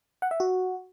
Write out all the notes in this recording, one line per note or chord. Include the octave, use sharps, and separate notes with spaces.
F#5
E5
F#4